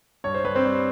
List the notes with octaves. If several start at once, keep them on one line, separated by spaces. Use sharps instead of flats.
G2 C#5
C5
G2 B4
C4 C5
G3